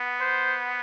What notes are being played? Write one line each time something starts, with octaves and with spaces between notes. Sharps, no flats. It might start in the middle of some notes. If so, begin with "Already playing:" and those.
Already playing: B3
C5